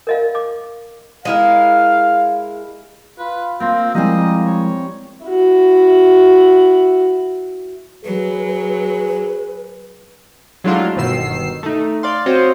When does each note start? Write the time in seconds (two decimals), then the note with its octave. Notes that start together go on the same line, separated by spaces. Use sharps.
0.07 A#4 D#5 F5
0.35 D6
1.25 G#3 E4 A#4 F5
3.18 F4 B4
3.60 A#3 C4 F4
3.94 F3 G3 G#3 A#3 C4 E4 D#5 G#5
4.46 C#5
5.26 E4 F#4
8.05 F#3 G#4 B4
10.64 F#3 G#3 A3 D4 E4 F4
10.96 G1 B2 D#3 E6 C7
11.63 A3 D#4
12.03 D5 F5 C6
12.26 C4 F4 F#4 C5 C#5 D#5